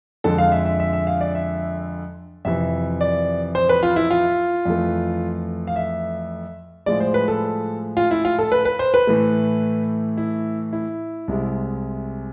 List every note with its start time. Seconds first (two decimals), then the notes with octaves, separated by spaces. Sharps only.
0.24 F2 D3 G#3 A4
0.38 F5
0.52 E5
0.66 E5
0.80 E5
0.93 E5
1.07 F5
1.21 D5
1.35 E5
2.45 F2 C3 E3 E5
3.01 D5
3.55 C5
3.69 B4
3.83 F4
3.96 E4
4.11 F4
4.65 F2 E3 A3
5.67 F5
5.76 E5
6.86 A2 F3 G#3 D5
7.00 C5
7.14 B4
7.28 A4
7.97 F4
8.11 E4
8.25 F4
8.39 A4
8.52 B4
8.65 B4
8.79 C5
8.94 B4
9.07 A2 E3 A3
10.17 E4
10.73 E4
11.28 C2 C3 G#3